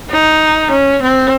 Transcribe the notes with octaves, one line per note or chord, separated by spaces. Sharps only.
D#4
C#4
C4